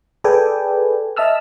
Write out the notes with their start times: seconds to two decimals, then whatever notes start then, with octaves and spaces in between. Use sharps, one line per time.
0.24 G#4 A4 B4 D5 G5 G#5
1.17 D#5 E5 A5 E6 F6